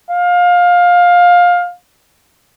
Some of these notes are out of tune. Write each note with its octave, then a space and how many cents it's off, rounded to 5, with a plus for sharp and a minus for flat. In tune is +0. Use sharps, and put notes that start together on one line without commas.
F5 +20